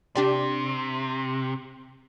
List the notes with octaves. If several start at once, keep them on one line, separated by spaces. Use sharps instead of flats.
C3 D4 G4 D5